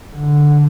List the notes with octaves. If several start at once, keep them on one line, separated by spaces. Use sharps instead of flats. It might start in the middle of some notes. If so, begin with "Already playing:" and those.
D3